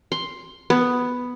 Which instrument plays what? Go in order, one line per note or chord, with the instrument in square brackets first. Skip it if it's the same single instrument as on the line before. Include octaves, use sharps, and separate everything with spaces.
[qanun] C6
B3